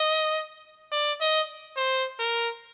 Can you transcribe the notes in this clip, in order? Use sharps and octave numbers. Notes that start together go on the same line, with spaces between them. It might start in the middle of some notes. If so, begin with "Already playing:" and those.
Already playing: D#5
D5
D#5
C5
A#4